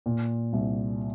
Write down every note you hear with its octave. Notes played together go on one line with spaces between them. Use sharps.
A#2
C2